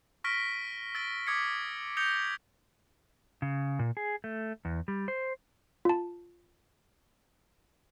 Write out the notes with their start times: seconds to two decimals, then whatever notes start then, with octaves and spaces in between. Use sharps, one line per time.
0.24 C#6 F6 A#6 B6 D7 G7
0.95 E6 A6 A#6 D7 G7
1.27 D6 D#6 G#6 B6 C#7
1.97 D#6 G6 A#6 C#7 F7 G7
3.42 C#3
3.79 A#2
3.97 G#4
4.24 A3
4.65 E2
4.88 G3
5.08 C5
5.85 F4 A5